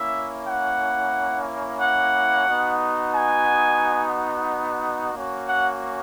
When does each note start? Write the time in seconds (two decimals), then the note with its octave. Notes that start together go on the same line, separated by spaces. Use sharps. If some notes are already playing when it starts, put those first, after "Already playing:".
Already playing: A#3 C#4 E4 E5
0.48 F#5
1.81 F#5
2.47 B3 D#4 F#4
3.14 G#5
5.13 A#3 C#4 F#4
5.47 F#5